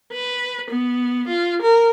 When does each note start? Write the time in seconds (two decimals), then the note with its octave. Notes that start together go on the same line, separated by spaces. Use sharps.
0.12 B4
0.70 B3
1.28 F4
1.62 A#4